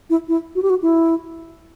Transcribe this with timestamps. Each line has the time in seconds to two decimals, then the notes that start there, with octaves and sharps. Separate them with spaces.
0.10 E4
0.28 E4
0.55 F#4
0.62 G4
0.70 F#4
0.82 E4